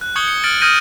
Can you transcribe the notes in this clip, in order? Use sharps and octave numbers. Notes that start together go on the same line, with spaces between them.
F#6
C#6 D#6 G6 G#6 C#7 G7
C#7
F6 A6 D7 F#7
D#6 F6 G6 A#6 D#7